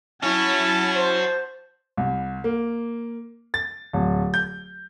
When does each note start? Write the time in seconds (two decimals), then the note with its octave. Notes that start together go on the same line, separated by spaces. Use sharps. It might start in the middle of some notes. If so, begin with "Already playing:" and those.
0.23 C#4 E4 F#4 C#5 A5
0.96 C5
1.97 C2
2.44 A#3
3.54 A6
3.93 D1
4.34 G6